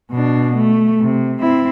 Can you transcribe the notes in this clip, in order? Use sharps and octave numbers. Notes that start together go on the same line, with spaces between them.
B2 D4
A3
C3
C4 E4